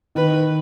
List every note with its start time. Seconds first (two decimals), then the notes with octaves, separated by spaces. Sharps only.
0.15 D#3 B4